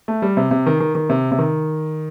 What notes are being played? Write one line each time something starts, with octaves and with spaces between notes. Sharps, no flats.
A3
G3
C3
C3
D#3
D#3
D#3
C3
C3
D#3